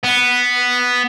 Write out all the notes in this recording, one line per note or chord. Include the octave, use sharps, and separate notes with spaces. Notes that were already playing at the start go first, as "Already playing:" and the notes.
B3